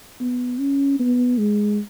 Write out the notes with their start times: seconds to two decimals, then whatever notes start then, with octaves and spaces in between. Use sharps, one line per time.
0.20 B3
0.60 C#4
1.00 B3
1.38 G#3